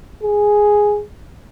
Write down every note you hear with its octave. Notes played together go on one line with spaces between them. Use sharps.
G#4